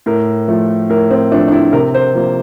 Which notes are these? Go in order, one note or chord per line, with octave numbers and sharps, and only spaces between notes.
A2 A#4
F3 A3
A2 A#4
C4
F3 A3 D4
D4
E4
C3 A#4
C5
F3 A#3